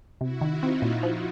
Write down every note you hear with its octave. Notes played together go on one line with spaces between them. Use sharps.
C3 E4 F#4
D#3
D#4 F4
C4
A#2
F3